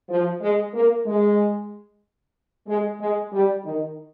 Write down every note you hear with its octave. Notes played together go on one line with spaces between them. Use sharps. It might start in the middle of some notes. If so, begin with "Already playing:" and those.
F3
G#3
A#3
G#3
G#3
G#3
G3
D#3